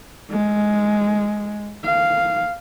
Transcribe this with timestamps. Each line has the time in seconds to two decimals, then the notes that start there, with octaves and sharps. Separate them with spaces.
0.31 G#3
1.84 F5